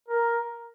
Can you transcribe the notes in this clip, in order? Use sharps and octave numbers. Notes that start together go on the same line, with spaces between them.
A#4